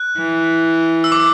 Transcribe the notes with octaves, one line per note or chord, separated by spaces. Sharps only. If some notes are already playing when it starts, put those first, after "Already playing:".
Already playing: F#6
E3
E6
D6